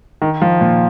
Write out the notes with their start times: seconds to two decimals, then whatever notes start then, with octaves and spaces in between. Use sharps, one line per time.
0.22 D#3
0.42 F3
0.61 A#2